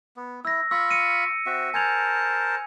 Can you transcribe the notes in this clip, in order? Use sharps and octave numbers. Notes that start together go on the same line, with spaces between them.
B3
E4 E6 A#6
F4 B5 C#6 E6
C#7 D#7
C4 F#4 E5
A#4 C5 G#5 A5 G#6 F7